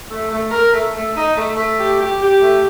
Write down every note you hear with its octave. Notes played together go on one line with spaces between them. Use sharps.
A3
A3
A#4
A3
A3
D#4
A3
A3
G4
G4
G4
A3